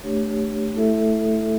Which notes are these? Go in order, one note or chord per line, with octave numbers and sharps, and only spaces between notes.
A3 D4 G4 C#5
A3 E4 A4 E5